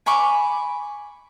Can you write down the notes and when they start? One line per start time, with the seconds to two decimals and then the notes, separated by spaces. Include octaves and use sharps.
0.06 G#5 B5 C#6 D6